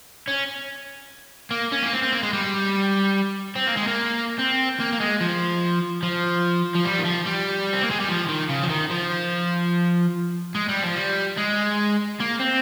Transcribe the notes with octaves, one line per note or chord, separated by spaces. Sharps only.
C#4
A#3
C#4
A#3
C4
C4
A#3
G#3
G3
C4
A#3
G#3
A#3
C4
A#3
A#3
G#3
F3
F3
F3
G3
D#3
F3
G3
C4
A#3
G#3
G3
F3
D#3
C#3
F3
D#3
F3
G#3
G3
F3
G3
G#3
A#3
C4